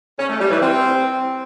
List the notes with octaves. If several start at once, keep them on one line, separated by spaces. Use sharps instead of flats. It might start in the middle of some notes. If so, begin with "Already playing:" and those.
C#4
A3
G3
E3
C4